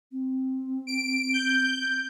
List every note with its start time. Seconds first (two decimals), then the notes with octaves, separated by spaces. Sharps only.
0.12 C4
0.87 D7
1.33 G6